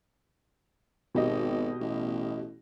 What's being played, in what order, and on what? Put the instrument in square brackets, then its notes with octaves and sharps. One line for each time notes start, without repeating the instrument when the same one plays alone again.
[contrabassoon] G#1 [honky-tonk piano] B2 G4 D#5
[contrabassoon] A1